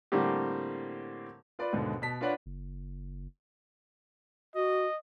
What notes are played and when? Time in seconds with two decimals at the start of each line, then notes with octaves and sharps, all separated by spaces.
0.12 A2 D3 G3 A#3 C4 G4
1.59 F4 B4 D5
1.72 D#2 G#2 B2 D3
2.02 B2 A5 B6
2.21 D4 F4 B4 C#5 D5 F#5
2.46 F#1
4.55 F#4 D#5